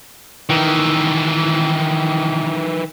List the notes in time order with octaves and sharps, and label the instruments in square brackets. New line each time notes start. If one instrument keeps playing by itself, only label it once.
[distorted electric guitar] D#3 E3